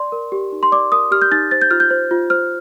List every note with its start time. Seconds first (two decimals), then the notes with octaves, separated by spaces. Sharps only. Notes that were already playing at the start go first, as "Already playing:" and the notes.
Already playing: D5 C6
0.12 A#4
0.32 G4
0.52 D#4
0.63 C6
0.72 D5 D6
0.92 A#4 D#6
1.11 G4 F6
1.22 G6
1.31 D#4 A6
1.51 C5 A6
1.61 G6
1.71 F4 F6
1.80 G6
1.90 C5
2.11 F4
2.30 C5 F6